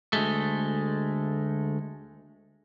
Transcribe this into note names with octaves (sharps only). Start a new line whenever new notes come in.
D2 G#3 A3